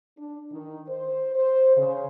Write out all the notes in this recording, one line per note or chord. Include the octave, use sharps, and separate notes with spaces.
D4
D#3
C5
C5
C#3